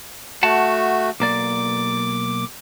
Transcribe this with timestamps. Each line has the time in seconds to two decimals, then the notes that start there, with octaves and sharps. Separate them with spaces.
0.43 A3 F#4 F#5 A5
1.20 B1 A#3 D5 D6